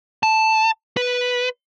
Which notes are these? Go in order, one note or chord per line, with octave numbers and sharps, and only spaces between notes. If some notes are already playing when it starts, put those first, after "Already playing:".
A5
B4